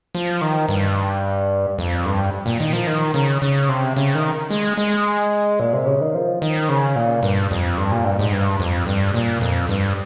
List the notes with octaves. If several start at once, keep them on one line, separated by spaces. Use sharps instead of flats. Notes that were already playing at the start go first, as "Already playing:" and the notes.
F3
D#3
G2
F2
G2
A#2
D#3
F3
D#3
C#3
C#3
C3
C#3
D#3
G#3
G#3
A#2
C3
C#3
D#3
F3
D#3
C#3
A#2
G2
F2
G2
A#2
G2
G#2
G2
F2
G2
A#2
F2
G2